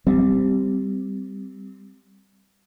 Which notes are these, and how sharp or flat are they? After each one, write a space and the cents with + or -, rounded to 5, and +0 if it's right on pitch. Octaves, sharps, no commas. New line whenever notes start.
G3 +0 C4 -15